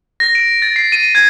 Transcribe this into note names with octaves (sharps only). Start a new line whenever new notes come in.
A#6
D7
A6
C7
D#7
G#6